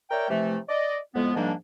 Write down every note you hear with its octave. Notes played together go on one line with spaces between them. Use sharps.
A#4 C#5 D5 E5 G5
C3 E3 F3 A3
D5 D#5
F2 A2 G#3 B3
G#2 D#3 F3 G3 A#3 D4